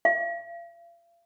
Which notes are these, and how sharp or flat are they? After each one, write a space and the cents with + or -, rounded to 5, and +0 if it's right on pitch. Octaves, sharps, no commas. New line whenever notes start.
F5 -40